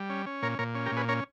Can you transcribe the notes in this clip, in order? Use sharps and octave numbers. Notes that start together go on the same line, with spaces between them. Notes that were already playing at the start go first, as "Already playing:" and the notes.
Already playing: G3
C#4
C#4
A#2 A#4 C#5
A#2 A#4 C#5
C#4
G4 A#4
A#2
G#4 B4
C#4 A#4 C#5